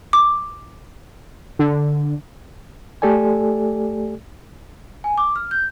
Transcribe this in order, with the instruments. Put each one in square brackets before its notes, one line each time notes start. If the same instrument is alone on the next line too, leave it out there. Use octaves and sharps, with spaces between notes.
[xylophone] D6
[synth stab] D3
[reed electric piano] A3 G4 A4 D5 G#5
[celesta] G#5
D6
F6
G6